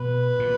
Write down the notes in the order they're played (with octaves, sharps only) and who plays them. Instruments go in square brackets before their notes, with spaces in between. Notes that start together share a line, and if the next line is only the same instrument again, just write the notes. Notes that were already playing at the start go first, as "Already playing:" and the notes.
Already playing: [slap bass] B2 [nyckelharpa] B4
[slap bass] A#2